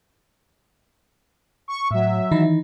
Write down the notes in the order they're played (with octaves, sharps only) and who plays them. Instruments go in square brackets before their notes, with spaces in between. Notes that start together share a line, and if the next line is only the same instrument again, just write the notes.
[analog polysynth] C#6
[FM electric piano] A2 [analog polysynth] F#3 E5
[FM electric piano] D#3 E3 D#4